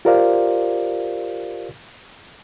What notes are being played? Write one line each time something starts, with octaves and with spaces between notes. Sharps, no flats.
F4 G4 A#4 C5 D5 F5